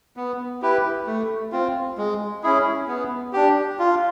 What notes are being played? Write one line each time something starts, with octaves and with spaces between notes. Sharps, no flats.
B3
E4 G4 B4
A3
C4 F4
G#3
C#4 E4 G#4
B3
D4 G4
F4